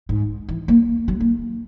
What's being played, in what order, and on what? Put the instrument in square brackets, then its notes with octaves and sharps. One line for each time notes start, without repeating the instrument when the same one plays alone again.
[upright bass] G#2
E3
A#3
F#3
A#3